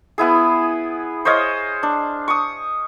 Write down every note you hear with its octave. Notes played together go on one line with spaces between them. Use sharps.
B3 E4 G#4
C5 C#5 D#5 F5
D4
C#6 D#6